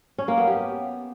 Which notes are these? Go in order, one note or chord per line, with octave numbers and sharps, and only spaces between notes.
C#4
A#3
B3
G4